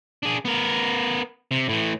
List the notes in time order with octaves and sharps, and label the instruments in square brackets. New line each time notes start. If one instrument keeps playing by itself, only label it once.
[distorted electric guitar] D4 G#4
B3 A#4
C3
A2 E3